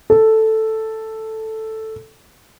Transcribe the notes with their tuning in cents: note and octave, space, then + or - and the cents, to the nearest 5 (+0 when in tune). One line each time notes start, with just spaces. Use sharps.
A4 +0